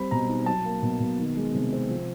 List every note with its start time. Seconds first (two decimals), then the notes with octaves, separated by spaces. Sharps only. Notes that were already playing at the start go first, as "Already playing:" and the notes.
Already playing: G3 C4 B5
0.11 B2 A#5
0.29 D#4
0.46 F#3 A5
0.65 A#3
0.83 B2
1.00 B2
1.19 D#3
1.36 G#3
1.54 C3
1.73 C4
1.90 F3